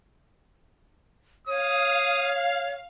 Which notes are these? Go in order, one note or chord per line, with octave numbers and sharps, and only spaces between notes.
C#5 F5 D#6